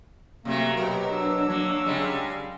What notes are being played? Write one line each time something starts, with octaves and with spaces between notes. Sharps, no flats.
C3 F#3 A3 A#3
B2 F#3 G4 A#4
D4 E6
F#3 A#3
C#3 G3 G#3